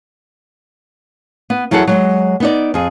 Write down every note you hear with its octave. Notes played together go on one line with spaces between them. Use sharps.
B3
E2 F#3 E4 G#4 A4 F#5
F#3 G#3
B3 D#4 D5
F2 G#4